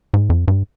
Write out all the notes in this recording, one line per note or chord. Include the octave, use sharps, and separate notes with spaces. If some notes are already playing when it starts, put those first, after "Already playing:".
G#2
F2
G2